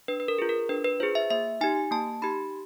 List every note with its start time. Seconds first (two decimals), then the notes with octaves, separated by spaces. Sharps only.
0.08 D4 B4
0.20 B4
0.28 A#4
0.39 F4 G#4
0.49 A#4
0.69 D4 B4
0.84 B4
1.00 F4 G#4 C5
1.15 E5
1.30 A#3 E5
1.61 D#4 G4 G#5
1.91 A#3 A5
2.22 D#4 G4 B5